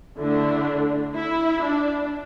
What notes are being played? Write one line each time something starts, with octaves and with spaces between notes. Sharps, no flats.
D3 A3 D4 E4
E4
D4